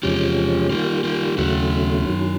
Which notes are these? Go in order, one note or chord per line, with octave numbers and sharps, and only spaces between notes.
E2 C3 F3 G#3 C#4 F4 G4
D#3 G3 A#3 F4 G4
F4 G4
D#2 C#3 F#3 A3 E4 F#4
F#2 D#3 F#3